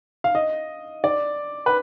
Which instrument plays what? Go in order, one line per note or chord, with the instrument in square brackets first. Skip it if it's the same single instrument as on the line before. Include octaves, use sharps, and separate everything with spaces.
[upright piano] F5
D#5
D5
B4